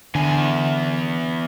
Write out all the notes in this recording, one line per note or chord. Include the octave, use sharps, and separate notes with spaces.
E2 D3 G#5